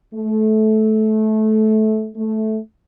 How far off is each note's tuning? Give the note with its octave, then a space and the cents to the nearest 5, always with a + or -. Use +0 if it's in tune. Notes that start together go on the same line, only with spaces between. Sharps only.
A3 -20
A3 -10